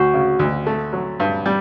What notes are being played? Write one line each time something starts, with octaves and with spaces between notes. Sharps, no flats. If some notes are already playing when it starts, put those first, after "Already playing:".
Already playing: D2 F#4
C#3
D2
A3
F#3
G2
G3